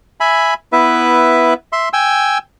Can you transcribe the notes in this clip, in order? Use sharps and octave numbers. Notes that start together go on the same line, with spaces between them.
E5 G#5 B5
B3 E4 B4 E5
E5 C6
G5 G#5 E6